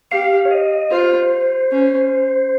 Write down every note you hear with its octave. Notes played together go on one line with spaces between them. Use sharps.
G4 F5
C#5
D#5
F4 C5
C#4